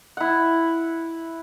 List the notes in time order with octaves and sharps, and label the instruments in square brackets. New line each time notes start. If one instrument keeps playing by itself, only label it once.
[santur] E4 F#5